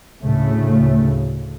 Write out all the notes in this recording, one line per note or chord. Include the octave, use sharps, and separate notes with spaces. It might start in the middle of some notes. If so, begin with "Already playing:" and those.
D2 A2 C#3 A3